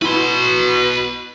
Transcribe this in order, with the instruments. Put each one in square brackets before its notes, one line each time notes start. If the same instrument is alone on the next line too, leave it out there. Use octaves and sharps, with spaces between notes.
[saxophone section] B2 [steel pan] E4 [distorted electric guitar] B4 C6